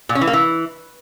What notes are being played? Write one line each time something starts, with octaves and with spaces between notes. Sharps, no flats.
A#2
C#4
E3
A#3
E3